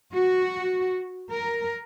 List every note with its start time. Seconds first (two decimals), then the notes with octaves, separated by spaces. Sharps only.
0.15 F#4
1.31 A#4